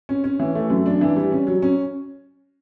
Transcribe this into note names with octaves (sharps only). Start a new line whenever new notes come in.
C#4
C#4
E3
A3
F#2
D4
E3
G3
C#4
F#3
C#4